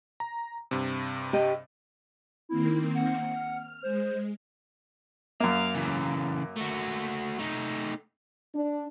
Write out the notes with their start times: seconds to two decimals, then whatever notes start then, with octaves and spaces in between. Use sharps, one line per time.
0.20 A#5
0.71 G2 C3
1.33 G4 D#5
2.49 D#3 A#3 C4 E4
2.95 F#5
3.27 F6
3.83 G#3 C5
5.40 F#2 A#3 F5
5.75 C#3 E3
6.56 A3 F#4
7.39 A3 D#4
8.55 D4